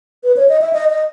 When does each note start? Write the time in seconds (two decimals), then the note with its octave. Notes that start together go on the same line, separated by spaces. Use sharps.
0.24 B4
0.37 C#5
0.49 D#5
0.61 E5
0.73 D#5
0.90 D#5